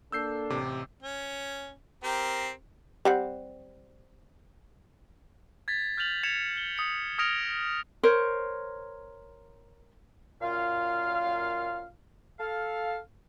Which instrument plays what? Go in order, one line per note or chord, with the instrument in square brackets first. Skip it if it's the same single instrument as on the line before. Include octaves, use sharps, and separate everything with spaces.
[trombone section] A#3 D4 A4 [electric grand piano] E6 G6 C7
[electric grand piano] A1 C3 D6
[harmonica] C#4
C4 G4 A#4
[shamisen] G3 C4 F#5
[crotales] G#6 A6 B6
F6 G6 A6 F7 F#7
G#6 A6 C#7 E7 F7
G7
D#6 C#7 F7
D#6 F6 G#6 A#6 D7 F7
[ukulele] A#4 C5 C#5
[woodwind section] F#2 A#2 F4 F5
A4 F5